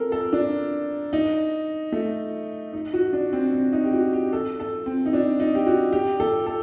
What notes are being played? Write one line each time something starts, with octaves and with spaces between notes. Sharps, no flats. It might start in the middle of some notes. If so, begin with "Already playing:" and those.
Already playing: C4 A4 A#4
A4
D4
D#4
A3
D#4
F#4
D4
C4
C4
D#4
G4
F#4
G4
A4
A4
C4
D#4
D4
D#4
G4
F#4
G4
A4
A4